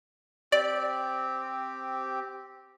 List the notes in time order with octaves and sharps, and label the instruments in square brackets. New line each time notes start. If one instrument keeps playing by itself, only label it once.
[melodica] C4 G4 [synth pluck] D5